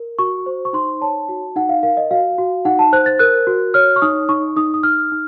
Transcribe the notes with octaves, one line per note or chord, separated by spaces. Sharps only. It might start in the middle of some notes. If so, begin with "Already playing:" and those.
Already playing: A#4
F#4 C#6
C5
C#6
D#4 C6
C#5 A5
F#4
D#4 F#5
F5
A#4 F5
D#5
F#4 F5
F#4
D#4 F#5
A5
C5 F#6
A6
A#4 F#6
F#4
C#5 F6
C#6
D#4 D#6
D#4 C#6
D#4 D#6
D#6
D#4 F6
D#4